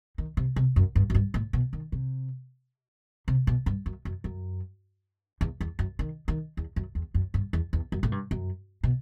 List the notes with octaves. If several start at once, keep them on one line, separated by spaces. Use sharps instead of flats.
D#3
C3
C3
F#2
G2
F#2
G2
A2
B2
D#3
C3
C3
B2
G2
F#2
F#2
F#2
E2
E2
F#2
D#3
D#3
E2
F#2
E2
F#2
G2
E2
E2
F#2
A2
G2
F#2
B2